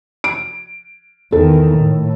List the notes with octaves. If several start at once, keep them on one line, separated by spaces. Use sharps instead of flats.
D7
E2 D#3 A4
A2